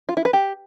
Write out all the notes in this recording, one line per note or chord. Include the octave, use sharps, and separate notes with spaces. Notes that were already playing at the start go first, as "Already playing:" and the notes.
F4
E4
B4
G4